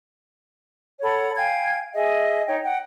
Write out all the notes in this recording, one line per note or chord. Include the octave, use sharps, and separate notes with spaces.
A4 C#5 F#5 B5
F5 G5 G#5 G#6
G#4 D#5 E5
D#4 C#5 G5
F#5 G5